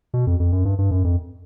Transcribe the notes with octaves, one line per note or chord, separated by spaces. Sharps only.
B2
F2
F2
F#2
G2
G2
F#2
F2